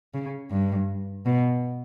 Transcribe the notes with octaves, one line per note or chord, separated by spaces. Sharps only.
C#3
G2
B2